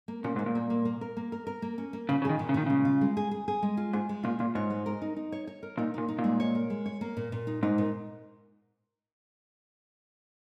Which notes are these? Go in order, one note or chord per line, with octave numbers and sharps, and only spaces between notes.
A#3
A#2 C#4
G#2 A#3
A#2
A#3
A#3
A#3
A#4
A#3
A#4
A#4
A#3
C#4
A#3
A#2 C#3
C#3
D#3 G#4
A#2
C#3
A#2 D#3
C#3 G#3
F4
G#3
G#4
G#4
G#4
G#3
F4
G#2 G#4
G#3
A#2 F4
A#2 F4
G#2 C#5
G#3
A#4
D#4
D#4
C#5
C#5
A#4
A#2 D#4
A#2 D#4
D#4
A#2
G#3
C#5
A#4
G#3
C#5
A#3
A#2
A#2
D#4
G#2 D#4
A#2